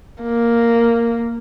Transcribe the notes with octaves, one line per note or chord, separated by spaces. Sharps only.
A#3